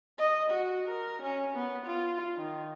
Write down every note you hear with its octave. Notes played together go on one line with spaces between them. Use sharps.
D#5
F#4
A#4
C#4
B3
F4
D#3